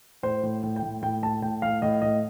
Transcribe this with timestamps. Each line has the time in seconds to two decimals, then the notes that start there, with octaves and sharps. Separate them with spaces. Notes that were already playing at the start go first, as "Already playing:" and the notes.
0.23 A2 C5
0.43 A2
0.63 A2
0.76 G5
0.82 A2
1.02 A2 G5
1.22 A2 A5
1.42 A2 G5
1.62 A2 F5
1.82 A2 D#5
2.02 A2 D#5